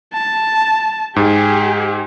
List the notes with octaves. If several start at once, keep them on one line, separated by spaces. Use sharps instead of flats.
A5
G#2 G4 G#4